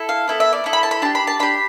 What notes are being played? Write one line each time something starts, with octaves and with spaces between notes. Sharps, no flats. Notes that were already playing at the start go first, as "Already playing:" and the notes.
Already playing: E4 A4
F5
B3 E4 A4
E5
D5
B3 E4 A4
B5
A5
B5
D4 G4 A5
B5
A5
D4 G4 B5